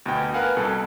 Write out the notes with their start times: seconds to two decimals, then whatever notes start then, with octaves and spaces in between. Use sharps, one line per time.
0.06 D2 B2 G5
0.34 A#4 B4 F5 F#5 G#5
0.56 C2 B2 A4